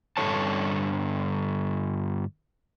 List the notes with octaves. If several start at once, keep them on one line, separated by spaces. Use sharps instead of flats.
G2 D3 F3 A4 C#5 A5